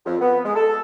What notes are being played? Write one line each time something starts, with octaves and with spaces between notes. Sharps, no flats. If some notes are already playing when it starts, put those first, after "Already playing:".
F2
B3
G#3
A4